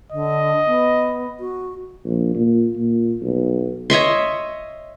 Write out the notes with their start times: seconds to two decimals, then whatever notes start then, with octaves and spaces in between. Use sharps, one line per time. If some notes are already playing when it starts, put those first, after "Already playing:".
0.12 D3 D#5
0.67 B3
1.40 F#4
2.05 A#1
2.34 A#2
2.77 A#2
3.22 B1
3.90 C#5 D#5 E5 C6